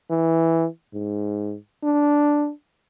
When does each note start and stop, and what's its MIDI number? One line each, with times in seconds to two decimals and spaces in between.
0.10 0.66 52
0.94 1.57 44
1.83 2.50 62